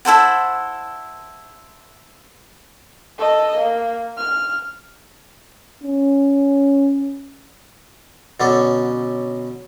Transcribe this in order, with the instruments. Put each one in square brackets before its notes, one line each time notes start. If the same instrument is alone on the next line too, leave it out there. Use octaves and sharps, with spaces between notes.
[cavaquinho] E4 A4 C5 F#5
[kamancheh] A4 D#5
A#3
F6
[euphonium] C#4
[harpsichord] B2 D3 F#3 C#4 D4 A4